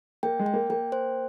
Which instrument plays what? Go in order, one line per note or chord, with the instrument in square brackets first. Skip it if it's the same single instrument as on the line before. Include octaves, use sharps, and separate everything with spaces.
[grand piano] A#3 [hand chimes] G5
[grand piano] G#3
[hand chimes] G5
[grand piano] A#3
[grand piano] A#3 [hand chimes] G5
[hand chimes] C5